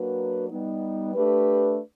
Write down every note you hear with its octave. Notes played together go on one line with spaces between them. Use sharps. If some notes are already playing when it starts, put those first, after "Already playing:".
Already playing: F#3 A#3 D4 F#4 B4
G3 B3 D#4
A3 D4 G4 B4